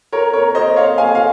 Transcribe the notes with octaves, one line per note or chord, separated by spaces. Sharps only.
A#4 C#5
A#4 C#5
C5 D#5
C#5 F5
F5 G#5
F5